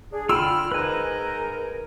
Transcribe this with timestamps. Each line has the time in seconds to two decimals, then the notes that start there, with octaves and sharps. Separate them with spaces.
0.12 D4 G#4
0.29 D3 F4 G5 B5 E6 F6
0.72 G#2 D#4 A#4 B4 G#5